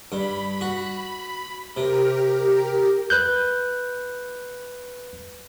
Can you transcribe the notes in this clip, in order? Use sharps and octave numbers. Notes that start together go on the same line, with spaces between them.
G2 B5
F#4
C3 G4 A#4
B4 F#6 G6